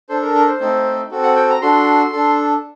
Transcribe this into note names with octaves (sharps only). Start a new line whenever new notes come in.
D4 A4 C5
A#4
A#4
C5
A3 C4 D#4 A4
C4 F#4 A4
F#5
G5
A#5
D4 F#4 A4 C6
D4 A4